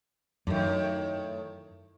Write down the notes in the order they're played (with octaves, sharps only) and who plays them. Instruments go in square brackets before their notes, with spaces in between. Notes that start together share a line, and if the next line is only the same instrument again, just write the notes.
[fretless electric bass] F#2 [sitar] A2 D#3